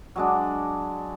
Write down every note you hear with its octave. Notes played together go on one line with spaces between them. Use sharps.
F#3 G#3 D4